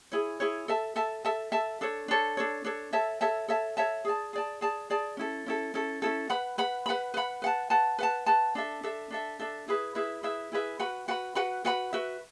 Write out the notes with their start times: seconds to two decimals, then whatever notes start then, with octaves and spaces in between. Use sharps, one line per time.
0.12 E4 G#4 C#5
0.40 E4 G#4 C#5
0.68 A4 E5 A5
0.96 A4 E5 A5
1.25 A4 E5 A5
1.52 A4 E5 A5
1.81 D4 A4 C#5
2.08 D4 A4 C#5
2.37 D4 A4 C#5
2.64 D4 A4 C#5
2.93 A4 C#5 E5 A5
3.21 A4 C#5 E5 A5
3.48 A4 C#5 E5 A5
3.77 A4 C#5 E5 A5
4.05 G#4 D5 A5
4.33 G#4 D5 A5
4.61 G#4 D5 A5
4.90 G#4 D5 A5
5.17 C#4 E4 A4
5.46 C#4 E4 A4
5.74 C#4 E4 A4
6.02 C#4 E4 A4
6.30 B4 F#5 B5
6.58 B4 F#5 B5
6.86 B4 F#5 B5
7.14 B4 F#5 B5
7.42 B4 F#5 A5
7.70 B4 F#5 A5
7.99 B4 F#5 A5
8.26 B4 F#5 A5
8.55 D4 A4 E5
8.83 D4 A4 E5
9.10 D4 A4 E5
9.39 D4 A4 E5
9.68 E4 G#4 B4 E5
9.95 E4 G#4 B4 E5
10.23 E4 G#4 B4 E5
10.52 E4 G#4 B4 E5
10.79 F#4 B4 F#5 B5
11.08 F#4 B4 F#5 B5
11.35 F#4 B4 F#5 B5
11.65 F#4 B4 F#5 B5
11.93 F#4 B4 E5